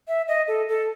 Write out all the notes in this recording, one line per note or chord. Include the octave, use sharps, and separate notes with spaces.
E5
D#5
A4
A4